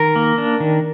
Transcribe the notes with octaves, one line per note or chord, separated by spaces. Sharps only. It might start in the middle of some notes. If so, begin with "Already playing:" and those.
Already playing: D#3 A#4
A#3
D4
D#3